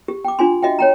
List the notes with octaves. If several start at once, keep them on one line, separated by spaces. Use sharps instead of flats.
G4
G5 D6
D4 F4 G#5 C6
F#4 D#5 E5 G5
C#5 G5 A#5